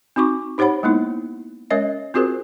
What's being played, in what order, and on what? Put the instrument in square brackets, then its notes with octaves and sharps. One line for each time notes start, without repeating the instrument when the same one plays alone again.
[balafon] C4 D#4 F#4 C#6 D6
D#4 G4 C5 C#5 F#5 B5
G#3 A#3 B3 D#4 E4
G#3 C#4 A#4 C#5 D#5 E5
C4 F4 F#4 G#4 A#4 C5